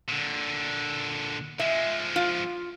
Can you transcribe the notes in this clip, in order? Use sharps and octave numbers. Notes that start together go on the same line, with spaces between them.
A#2 D3
F3 G#3 E5
F4